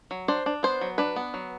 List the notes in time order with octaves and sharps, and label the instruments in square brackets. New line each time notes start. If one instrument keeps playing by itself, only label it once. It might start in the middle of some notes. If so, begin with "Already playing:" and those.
[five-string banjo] F#3
D4 C5
D4
B3 C5
F#3
D4 B4
B3
F#3